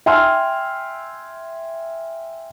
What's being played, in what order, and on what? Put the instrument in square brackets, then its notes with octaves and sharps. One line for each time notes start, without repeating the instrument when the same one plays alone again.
[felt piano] E5 G5 G#5 C6 E6 F6